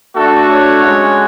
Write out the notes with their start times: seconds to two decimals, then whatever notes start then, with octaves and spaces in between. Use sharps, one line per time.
0.15 A3 D4 F#4 A4
0.50 C#5
0.84 G#3 C#4 F#4